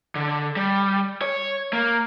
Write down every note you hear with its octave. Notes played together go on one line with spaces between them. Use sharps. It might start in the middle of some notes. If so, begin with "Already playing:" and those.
D3
G3
C#5
A#3